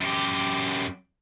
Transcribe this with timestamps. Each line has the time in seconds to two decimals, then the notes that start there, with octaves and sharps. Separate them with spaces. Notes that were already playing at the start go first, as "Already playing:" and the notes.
0.01 F#2 G4